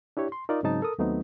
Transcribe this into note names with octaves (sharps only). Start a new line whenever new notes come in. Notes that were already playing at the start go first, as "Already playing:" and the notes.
D4 E4 G4 C#5
C6
D#4 F4 A#4 D5 D#5
G#2 C#3 F#3 C4 D#4 A5
A4 A#4 D#6
D#2 F#3 A3 B3 C4 D#4